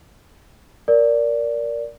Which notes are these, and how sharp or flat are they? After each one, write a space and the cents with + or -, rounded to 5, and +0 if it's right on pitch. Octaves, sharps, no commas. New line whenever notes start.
A#4 +0 D5 -10